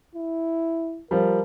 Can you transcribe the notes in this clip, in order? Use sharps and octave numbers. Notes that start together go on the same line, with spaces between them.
E4
F3 G3 A#4